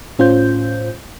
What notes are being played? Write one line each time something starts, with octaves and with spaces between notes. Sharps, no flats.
A2 C#4 F4 C5 G6